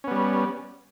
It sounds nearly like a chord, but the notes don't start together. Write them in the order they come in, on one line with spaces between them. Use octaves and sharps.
C#4 B3 G3